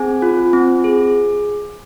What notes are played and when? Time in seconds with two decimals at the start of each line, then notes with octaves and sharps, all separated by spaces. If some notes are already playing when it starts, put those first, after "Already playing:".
Already playing: C4 G#4 G#5
0.22 F4
0.53 C4
0.84 G#4